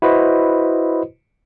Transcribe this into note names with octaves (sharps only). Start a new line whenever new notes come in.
E4 F#4 B4 C5 D#5